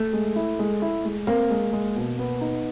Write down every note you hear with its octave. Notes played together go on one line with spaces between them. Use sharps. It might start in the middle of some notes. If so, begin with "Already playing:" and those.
Already playing: A3
G#3
E4
G#3
E4
G#3
A#3 C4
G#3
G#3
B2
B3
D#4